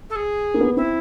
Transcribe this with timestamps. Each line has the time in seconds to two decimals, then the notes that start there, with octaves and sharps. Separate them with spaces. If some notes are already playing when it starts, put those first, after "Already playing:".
0.10 A4
0.15 G#4
0.54 A#3
0.61 B3
0.76 C4 E4